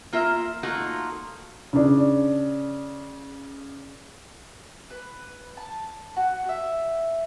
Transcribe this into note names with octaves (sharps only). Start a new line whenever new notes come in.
A#3 F4 A#4 E5
A3 A#3 D#4 F4 F#4
C#3 D4
B4
A5
F#4
E5